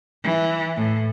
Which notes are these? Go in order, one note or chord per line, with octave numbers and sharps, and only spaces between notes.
E3
A2